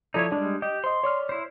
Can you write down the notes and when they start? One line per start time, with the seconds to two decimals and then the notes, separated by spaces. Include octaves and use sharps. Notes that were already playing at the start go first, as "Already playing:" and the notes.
0.14 F3 D#4 E4 A4 C#5 D5
0.32 G3 G#3 D4
0.62 G4 D#5
0.84 C5 D#5 C6
1.03 C#5 D5 F6
1.29 E4 C5